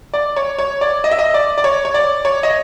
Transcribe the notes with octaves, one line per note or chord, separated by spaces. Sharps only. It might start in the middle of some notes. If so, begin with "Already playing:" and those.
D5
C#5
C#5
D5
D#5
E5
D#5
D5
D5
C#5
C#5
D5
C#5
D#5